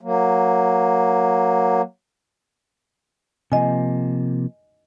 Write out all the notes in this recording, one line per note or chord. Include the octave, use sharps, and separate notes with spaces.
F#3 A#3
C3 F3 A#3 D#5 G#5